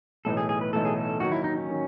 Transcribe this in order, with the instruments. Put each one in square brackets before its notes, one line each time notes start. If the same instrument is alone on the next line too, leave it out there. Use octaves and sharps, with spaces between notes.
[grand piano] B1 A2 E3 A3 D#4 [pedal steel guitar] A4
[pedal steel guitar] G#4
G#4
B4
[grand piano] B1 A2 E3 A3 D#4 [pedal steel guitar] A4
[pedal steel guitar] G#4
A4
[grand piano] D#2 D#3 F#3 [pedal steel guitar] F#4
[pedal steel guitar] E4
D#4
C#4
[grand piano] D#3 F#3